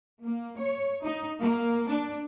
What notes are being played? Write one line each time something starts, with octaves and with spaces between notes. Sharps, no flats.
A#3
C#5
D#4
A#3
D4